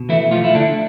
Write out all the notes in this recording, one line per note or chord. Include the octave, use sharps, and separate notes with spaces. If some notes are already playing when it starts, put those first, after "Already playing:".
Already playing: B2
E3 A3 E4
F3 A3 F4
E4
D3 A3 D4